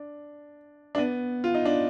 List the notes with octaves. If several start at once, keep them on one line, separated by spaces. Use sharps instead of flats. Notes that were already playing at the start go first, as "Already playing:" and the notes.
Already playing: D4
D4
B3
F4
D#4
D4